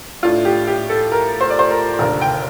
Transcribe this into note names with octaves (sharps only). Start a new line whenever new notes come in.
A2 A3 D4 F4
G4
G4
A4
A#4
C5
D5
C5
A#4
F1 D#2 D3 A#4
G5